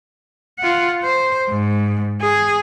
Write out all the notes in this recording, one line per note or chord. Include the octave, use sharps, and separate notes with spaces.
F4 F#5
C5
G#2
G#4